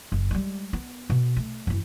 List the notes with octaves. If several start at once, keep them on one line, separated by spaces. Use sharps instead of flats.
F#1
G3 G#3
B3
B2
A3
F#2 E3